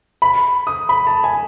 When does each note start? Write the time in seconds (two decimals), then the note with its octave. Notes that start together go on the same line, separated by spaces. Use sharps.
0.22 B5
0.67 D#6
0.89 B5
1.07 A5
1.24 G#5